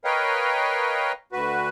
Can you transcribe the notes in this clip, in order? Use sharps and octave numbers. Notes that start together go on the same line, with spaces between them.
A#4 B4 C#5 D#5 F5 G5
D2 F#4 B4